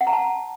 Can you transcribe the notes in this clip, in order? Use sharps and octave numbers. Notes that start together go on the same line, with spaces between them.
F#5
A#5
A5